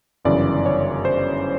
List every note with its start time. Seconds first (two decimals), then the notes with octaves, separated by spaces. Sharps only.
0.25 G1 F#2 C#3 E3 D5
0.66 C#5
1.05 C5